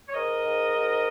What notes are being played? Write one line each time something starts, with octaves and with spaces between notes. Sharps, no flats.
C#5
G#2 A#4 D#5
G#2
G#2